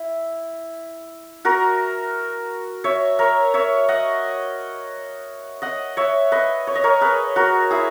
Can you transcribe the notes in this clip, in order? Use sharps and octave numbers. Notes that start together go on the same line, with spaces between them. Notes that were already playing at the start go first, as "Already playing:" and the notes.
Already playing: E4
F#4 A#4
C#5 E5
A#4 C#5
C#5 E5
D#5 F#5
D#5 F#5
C#5 E5
B4 D#5
C#5
D#5
A#4 C#5
G#4 B4
F#4 A#4
E4 G#4